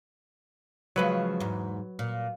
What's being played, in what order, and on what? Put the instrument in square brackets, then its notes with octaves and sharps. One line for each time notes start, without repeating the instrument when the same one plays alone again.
[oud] C#3 F3 G#3 [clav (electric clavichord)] F#3 B4
[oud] E2 G#2
A#2